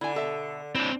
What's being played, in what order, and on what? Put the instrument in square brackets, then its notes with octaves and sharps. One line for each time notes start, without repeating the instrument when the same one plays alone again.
[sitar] D3 [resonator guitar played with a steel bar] E4 G#5
[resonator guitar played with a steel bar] B2 A4 E5
[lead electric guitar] C4 D4 [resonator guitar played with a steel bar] E4 C5